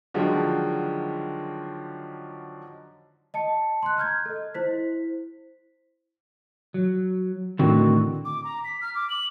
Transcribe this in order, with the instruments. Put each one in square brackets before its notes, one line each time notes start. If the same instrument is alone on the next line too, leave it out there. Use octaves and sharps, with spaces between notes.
[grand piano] D3 D#3 F3 F#3 G#3
[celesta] D#5 A5 C#7
C6 F#6
A#5 F6 G6 G#6
A4 D#5
E4 C5 B6
[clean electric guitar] F#3
[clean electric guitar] A2 D3 [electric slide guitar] D#3 C4 F#4
[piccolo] D6
A#5
B6
F6
D6
F#7